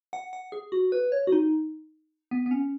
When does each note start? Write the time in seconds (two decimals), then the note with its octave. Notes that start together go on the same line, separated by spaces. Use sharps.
0.13 F#5
0.33 F#5
0.52 G#4
0.72 F#4
0.92 B4
1.12 C#5
1.27 F#4
1.32 D#4
2.31 B3
2.46 B3
2.51 C#4